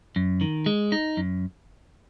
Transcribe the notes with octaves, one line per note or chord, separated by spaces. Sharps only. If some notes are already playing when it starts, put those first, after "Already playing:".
F#2
D#3
G#3
D#4
F#2